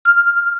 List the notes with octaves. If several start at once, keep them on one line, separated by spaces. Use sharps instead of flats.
F6